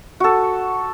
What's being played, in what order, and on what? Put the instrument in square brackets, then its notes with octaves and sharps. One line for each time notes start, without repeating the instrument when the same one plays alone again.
[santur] F#4 A4